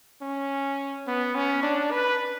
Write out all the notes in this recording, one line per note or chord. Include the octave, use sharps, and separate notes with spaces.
C#4
B3
C#4
D4
B4